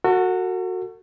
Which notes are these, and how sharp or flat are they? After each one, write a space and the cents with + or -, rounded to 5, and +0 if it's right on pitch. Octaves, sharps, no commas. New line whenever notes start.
F#4 -10 A4 +40